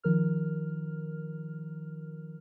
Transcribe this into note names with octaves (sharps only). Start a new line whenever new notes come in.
D#3 F3 A#4 F6